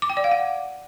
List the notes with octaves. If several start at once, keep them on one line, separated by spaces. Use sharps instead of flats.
D6
G5
D5
F5
F#5